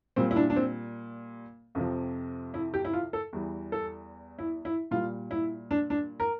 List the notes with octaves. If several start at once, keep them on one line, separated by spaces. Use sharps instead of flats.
A#2 G3 C4
E4
D4
D4
C4
F2 C3 F3
E4
G4
E4
F4
A4
E2 E3 G3
A4
E4
E4
A#2 G3 F4
E4
D4
D4
A#4